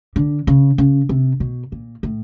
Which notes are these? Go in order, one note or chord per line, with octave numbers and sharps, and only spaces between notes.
D3
C#3
C#3
C3
B2
A#2
A2